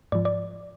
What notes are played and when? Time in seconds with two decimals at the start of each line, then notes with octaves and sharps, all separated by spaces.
0.12 G#2 F3 D5
0.25 D5